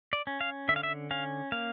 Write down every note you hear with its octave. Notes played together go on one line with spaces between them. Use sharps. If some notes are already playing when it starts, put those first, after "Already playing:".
D5
C#4
F5
D3 E5
F5
E5
C#4 F5
A#3 F5